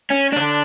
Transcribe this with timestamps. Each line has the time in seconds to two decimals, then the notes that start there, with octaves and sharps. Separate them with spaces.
0.10 C#4
0.32 C#3 D4
0.40 D3